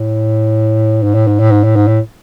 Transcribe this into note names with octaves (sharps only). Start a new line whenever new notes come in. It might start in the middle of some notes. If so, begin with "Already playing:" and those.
Already playing: A2
G#2
A2
G#2
A2
G#2
A2
G#2
A2